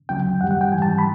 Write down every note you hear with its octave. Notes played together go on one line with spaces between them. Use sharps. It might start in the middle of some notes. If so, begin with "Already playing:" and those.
D2 C#3 F#3 G5
F#2 D#3 G3 F#5
F#5
G5
G#2 E3 G3 G#5
A5
B5